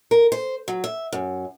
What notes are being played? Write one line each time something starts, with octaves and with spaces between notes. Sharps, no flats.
A#4
C5
F#3
E5
F#2